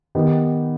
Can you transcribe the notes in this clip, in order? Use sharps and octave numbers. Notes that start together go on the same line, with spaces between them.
D#3 B3 D#4 G4